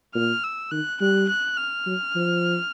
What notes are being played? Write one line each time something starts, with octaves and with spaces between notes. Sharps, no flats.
A#2 F6
E6
D#3 F#6
G3 F#6
F#6
F6
F#3
F3